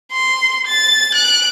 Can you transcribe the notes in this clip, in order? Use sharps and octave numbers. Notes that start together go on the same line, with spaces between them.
C6
A6
F#6 D7